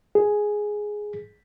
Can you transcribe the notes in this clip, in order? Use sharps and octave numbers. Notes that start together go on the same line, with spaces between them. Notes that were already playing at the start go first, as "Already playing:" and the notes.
G#4